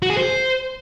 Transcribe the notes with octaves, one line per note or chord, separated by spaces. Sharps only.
F#4
G#4
C5